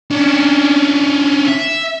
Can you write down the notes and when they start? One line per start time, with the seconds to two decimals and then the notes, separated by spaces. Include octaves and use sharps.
0.11 C#4 D4
1.48 E5